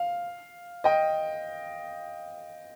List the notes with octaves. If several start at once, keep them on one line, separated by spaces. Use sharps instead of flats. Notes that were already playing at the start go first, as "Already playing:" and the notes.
Already playing: F5
D#5 G5